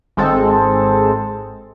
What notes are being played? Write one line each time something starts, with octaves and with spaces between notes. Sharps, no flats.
G#1 G#3 C4 A4